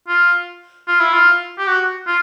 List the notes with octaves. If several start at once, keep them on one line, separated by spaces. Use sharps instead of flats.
F4
F4
E4
F4
G4
F#4
F4